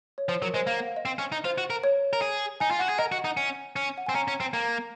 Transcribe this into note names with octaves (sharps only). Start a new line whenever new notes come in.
C#5
F3 C5
F#3 A#4
G#3 C5
A#3 F5
F#5
F5
D#5
C4
C#4
D#4
F4 C5
F#4
A#4
C#5
A#4
G#4
D#4 G#5
F4
F#4 F#5
G#4
A#4 D#5
F#4
F#5
D#4
C#4 G#5
C#4
F#5
C4 G#5
C#4 A#5
C#4
C4
A#3 A#5